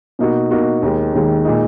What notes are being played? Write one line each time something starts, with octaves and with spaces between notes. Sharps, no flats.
B2 A#3 D#4 F#4
B2 A#3 D#4 F#4
D#2 D#3 G#3
D#2 D#3 G#3
A#2 G#3 D#4